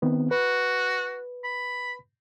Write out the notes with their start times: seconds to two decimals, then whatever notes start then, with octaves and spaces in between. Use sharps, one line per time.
0.02 D#3 B3 C4
0.31 F#4 B4
1.44 B5